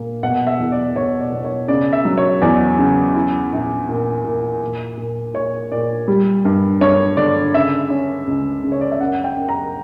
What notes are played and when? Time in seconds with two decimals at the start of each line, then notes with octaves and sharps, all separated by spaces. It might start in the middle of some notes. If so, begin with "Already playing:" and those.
Already playing: A#2 A#3
0.23 B2 F#5
0.47 E5
0.59 E2
0.72 D5
0.96 B2 C#5
1.21 D5
1.32 B2
1.44 C#5
1.68 C#3 D5
1.93 E5
2.05 F#3
2.18 C#5
2.42 E2 D5
2.78 C#3
3.15 E4
3.52 A#1
3.89 A#2
4.24 A#2
4.62 A#2
4.97 A#2
5.34 A#2 C#5
5.72 A#2 D5
6.08 G3
6.45 G2
6.81 G2 C#5
7.17 D3 D5
7.54 C#3 E5
7.90 C#4
8.27 C#2
8.63 C#3
8.72 C#5
8.81 D5
8.92 E5
9.00 F#2 F#5
9.24 G5
9.36 F#2
9.49 A#5